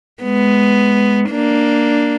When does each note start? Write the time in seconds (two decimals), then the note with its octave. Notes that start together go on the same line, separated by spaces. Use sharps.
0.23 G#3 B3
1.30 A#3 D4